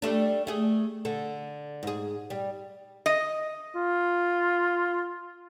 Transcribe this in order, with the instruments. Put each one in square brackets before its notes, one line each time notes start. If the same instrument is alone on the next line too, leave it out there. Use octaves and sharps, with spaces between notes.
[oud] G3 A3 D4
A3 G#4
D3 A4
G#2 G#4
G3
[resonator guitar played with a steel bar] D#5
[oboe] F4